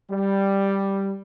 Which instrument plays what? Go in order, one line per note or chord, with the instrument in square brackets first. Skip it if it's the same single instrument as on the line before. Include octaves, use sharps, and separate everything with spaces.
[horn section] G3